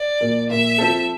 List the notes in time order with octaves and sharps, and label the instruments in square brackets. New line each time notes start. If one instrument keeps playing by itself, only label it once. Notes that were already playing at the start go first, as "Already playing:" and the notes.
Already playing: [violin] D5
[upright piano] A#2 F3 A#3
[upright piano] A#2 F3 A#3 [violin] E5
[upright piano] F3 C4 F4 A4